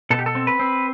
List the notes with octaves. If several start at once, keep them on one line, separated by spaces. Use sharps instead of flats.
B2 A4
G4
A4
C4
B4
C4